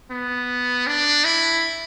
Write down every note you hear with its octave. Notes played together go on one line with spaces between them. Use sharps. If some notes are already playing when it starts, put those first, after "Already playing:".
B3
D4
E4